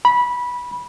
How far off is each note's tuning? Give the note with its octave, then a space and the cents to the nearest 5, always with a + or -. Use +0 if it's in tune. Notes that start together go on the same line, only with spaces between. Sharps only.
B5 -15